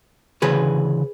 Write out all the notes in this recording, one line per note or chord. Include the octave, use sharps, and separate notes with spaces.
D2 C#3 E3 G#4 B4